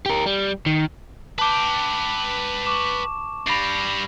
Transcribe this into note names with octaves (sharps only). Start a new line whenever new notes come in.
G4 A#4
G3
D#3
B4 G5 A5 D6
C#6 D6 E7
G2 G3 B5 A#6 C7